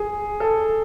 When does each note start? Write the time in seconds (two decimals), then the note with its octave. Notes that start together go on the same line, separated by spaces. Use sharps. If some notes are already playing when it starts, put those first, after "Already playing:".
Already playing: G#4
0.40 A4